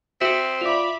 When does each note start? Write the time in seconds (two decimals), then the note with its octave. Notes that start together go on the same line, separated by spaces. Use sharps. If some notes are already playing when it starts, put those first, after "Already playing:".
0.21 C4 F#4 E5 B6
0.61 F4 D5 E5 B5 D6 F7